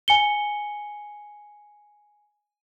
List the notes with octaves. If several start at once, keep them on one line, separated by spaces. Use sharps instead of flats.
G#5 C#7 G7